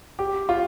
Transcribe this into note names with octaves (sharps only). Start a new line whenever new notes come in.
G4
F4